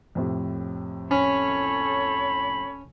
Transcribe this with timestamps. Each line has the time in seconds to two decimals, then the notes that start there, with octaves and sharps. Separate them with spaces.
0.15 F2 A2 C3
1.11 C#4 A4 C#5 B5